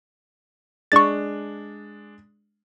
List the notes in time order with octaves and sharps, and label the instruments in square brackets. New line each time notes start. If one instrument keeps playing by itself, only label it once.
[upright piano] G#3 D4 [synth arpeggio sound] C#6 A6